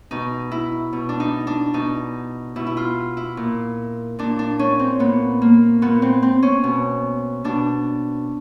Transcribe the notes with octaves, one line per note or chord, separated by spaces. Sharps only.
B2 D#4
E4
B2
D4
D#4
D4
B2 D#4
B2 E4
E4
F4
E4
A#2
A#2 D4
D4
C#4
C4
A#2 B3
A#3
A#2 B3
C4
C4
C#4
B2
B2 D4